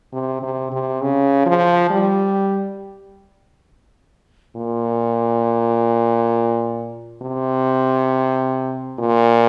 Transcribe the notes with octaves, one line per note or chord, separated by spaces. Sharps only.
C3
C3
C3
C#3
F3
G3
A#2
C3
A#2